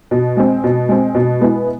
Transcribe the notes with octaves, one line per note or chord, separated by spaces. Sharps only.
B2
G#3 C4
B2
G#3 C4
B2
G#3 B3 E4